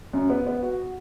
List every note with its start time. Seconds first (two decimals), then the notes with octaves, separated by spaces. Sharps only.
0.13 F#2
0.30 B3
0.47 B3
0.63 F#4